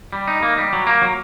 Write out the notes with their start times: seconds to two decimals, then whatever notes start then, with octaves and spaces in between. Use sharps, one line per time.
0.13 G3
0.28 D#4
0.43 A#3
0.58 G3
0.73 F#3
0.87 A#3
1.02 F#3